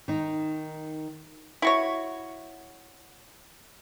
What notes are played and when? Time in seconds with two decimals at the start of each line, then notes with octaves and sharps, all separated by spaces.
0.08 D#3 D#4
1.62 E4 F#4 C#5